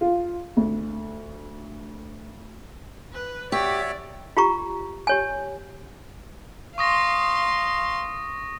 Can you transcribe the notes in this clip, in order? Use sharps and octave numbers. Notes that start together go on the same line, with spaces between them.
F4
D2
B4
F#4 G4 C#5 D5 E5
F4 G4 A#5 C#6
G4 C#5 G#5
F5 C6 C#6 D#6 A#6